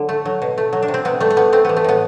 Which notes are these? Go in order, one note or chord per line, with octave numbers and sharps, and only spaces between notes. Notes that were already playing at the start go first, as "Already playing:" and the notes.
Already playing: D3 F#3
A3
F#3
B2
A3
F#3
D4
C3
C4
C3 B3
G3 A3
A3
G3 B3
A3 C4
E3 B3
A3
A2 B3